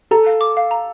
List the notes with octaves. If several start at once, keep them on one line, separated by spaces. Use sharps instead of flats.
A4 A#5
F5
D6
F5
A#5